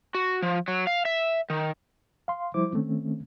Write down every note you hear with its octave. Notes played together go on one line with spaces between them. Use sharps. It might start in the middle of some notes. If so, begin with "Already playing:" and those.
F#4
F3
F#3
F5
E5
D#3
F5 C6
F3 G3 E4 C5 D6
D#3 A3 C4 C#4